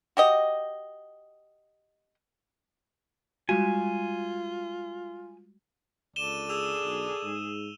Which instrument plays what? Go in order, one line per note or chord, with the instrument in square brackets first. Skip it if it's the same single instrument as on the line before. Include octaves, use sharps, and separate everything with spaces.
[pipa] F#4 G4 D#5
[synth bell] G3 G#3 F#4 [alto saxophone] F4 [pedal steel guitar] G#5
[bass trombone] C#2 [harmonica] A4 D5 [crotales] D#7 E7 G7
[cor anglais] G#4 [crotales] E6 F7
[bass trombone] B1
G#2